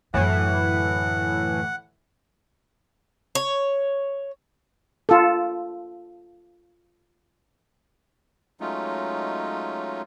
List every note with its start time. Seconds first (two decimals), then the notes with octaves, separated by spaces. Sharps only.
0.14 F#2 A2 D3 E3 F#5
3.35 C#5
5.09 F4 A4
8.60 F#3 G#3 A3 C#4 D#4 F4